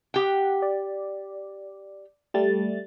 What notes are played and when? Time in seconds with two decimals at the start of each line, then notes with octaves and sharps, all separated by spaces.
0.14 G4 F#5 G5
0.62 D5
2.34 G3 A3 A6